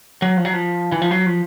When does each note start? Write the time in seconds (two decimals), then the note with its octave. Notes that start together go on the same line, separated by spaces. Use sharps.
0.22 F#3
0.37 F3
0.45 F#3
0.53 F3
0.92 E3
1.02 F3
1.11 F#3
1.26 F3